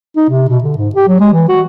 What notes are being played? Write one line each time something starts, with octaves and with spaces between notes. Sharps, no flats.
D#4
C3
B2
D3
G#2
G4
F#3
G#3
E3
F#4